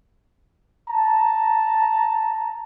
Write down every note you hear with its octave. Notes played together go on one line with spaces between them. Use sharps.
A5 A#5